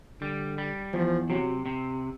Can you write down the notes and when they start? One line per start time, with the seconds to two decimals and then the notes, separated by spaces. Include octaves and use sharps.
0.21 D3 G3
0.58 G3
0.93 E2 F3
1.30 C3 F#3
1.66 C3